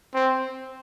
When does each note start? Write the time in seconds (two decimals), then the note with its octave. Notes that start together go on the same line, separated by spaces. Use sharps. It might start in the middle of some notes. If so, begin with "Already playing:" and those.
0.15 C4